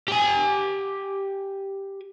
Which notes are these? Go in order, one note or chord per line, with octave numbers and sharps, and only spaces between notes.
G4 G#5